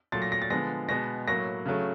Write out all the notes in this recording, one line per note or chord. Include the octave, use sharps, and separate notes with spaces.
A#2 F#3 A3 A6
A#6
A#6
A6
D3 F3 G#3 B3 A#6
B2 G#3 B3 A#6
A2 F#3 A#3 A#6
C#3 F#3 A3